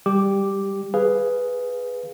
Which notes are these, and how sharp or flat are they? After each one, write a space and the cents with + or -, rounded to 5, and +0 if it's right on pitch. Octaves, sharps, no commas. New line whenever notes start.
G3 +5 G4 +0 D6 +0
G#4 +0 B4 +0 F5 -10